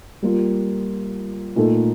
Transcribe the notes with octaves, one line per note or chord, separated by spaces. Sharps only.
G3 A#3 F4
A#2 A3 D#4 A4